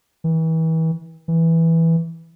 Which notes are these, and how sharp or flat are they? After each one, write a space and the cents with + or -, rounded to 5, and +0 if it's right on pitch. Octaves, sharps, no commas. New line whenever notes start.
E3 -35
E3 -5